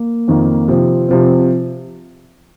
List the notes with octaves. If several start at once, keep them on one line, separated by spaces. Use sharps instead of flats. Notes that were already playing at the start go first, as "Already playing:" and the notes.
Already playing: A#3
F2 D#3 A#3
C3 F3 C4
C3 F3 C4